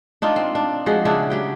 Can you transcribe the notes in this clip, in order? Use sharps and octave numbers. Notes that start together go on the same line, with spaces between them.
D4 D#4 F4
C4
D4
F3 G#3 F#4 G#4
C#3 D4 E4 F#4
F#3 G4 G5